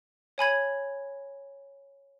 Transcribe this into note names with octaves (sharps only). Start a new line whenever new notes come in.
C#5 G#5 B5 G#6